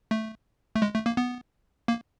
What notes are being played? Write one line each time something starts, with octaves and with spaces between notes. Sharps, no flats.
A3
A3
G#3
A3
A#3
B3
A#3